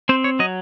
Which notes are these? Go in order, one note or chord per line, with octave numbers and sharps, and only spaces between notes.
C4 C5
C#5
F#3 D#5